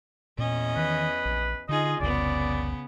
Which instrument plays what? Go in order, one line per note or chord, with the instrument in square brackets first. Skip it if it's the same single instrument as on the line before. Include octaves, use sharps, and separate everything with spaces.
[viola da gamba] E2 C#4 D#5 [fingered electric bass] A#2
[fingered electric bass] D#3 E3 [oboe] B4
[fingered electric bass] A#1
[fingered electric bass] D3 [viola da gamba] D#4 F4 G#4 [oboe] D#5
[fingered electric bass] F1 C2 F2 [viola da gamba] C#3 B3 [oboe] D5